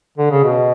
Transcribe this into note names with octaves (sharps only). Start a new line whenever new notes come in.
D3
C#3
B2